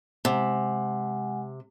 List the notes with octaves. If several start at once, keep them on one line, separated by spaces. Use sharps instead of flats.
C3 G#3 F#5 G#5